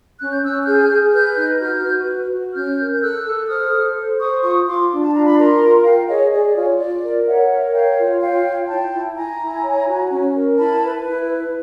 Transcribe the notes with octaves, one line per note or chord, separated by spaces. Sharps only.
C#4 F#6
G6
C#4 E6 F#6
G#4 F6 G6
G#4
B4 F6 G6
D#4
F#4 F6 G6
B4
F#4
F#4
C#4 F6 G6
A#4
G6
A4 E6 F#6
A4
C5 D#6 F6
A4
C5
C5 C#6 D#6
F4 C#6 D#6
F4 C6 D6
D4
A5
F4 A#5
B5
A#4 A#5 C6
F4
F4 F5 G5
G#4 C#5 D#5
G#4 D5
F4 C#5
F4 D5
A#4
C#5 E5 F#5
A#4
C#5 F5 G5
F4
C#5 F5 G5
F4
E4 G5 A5
E4
E4 G#5 A#5
E4
C#5
F#4
C#4
A#4
E4 A5 B5
B4
E4
B4